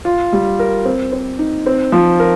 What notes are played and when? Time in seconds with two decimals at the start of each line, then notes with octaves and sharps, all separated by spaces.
0.05 F4
0.33 G3
0.59 A#4
0.85 C4
1.13 C4
1.39 D#4
1.66 C4
1.92 F3
2.20 A#4